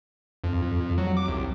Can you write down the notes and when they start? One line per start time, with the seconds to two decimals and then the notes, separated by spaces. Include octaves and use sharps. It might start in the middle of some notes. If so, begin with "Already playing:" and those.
0.44 F2
0.98 F#3
1.17 D6
1.28 C2